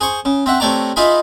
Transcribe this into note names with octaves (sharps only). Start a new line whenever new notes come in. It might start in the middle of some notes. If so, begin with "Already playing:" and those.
G#4 C5 C#6
C#3
C4 E5 F#5
C3 A3 C#5 D5 A#5
D#4 F4 G#4 E5 B5